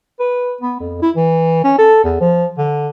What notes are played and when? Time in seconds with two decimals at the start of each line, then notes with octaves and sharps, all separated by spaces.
0.20 B4
0.61 B3
0.80 F2
1.02 E4
1.16 E3
1.64 C#4
1.79 A4
2.04 E2
2.21 F3
2.58 D3